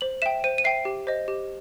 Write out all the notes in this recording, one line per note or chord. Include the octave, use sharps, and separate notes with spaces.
C5 F#7
E5 G5 E7
C5 D#7
D#7
E5 G5 C7
G4
C5 D#5
G4